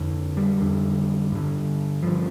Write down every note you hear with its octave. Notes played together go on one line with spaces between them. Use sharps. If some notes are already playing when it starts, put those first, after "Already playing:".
Already playing: F2 D3
G3
F2 D3
G2 D3
G2 D3 F3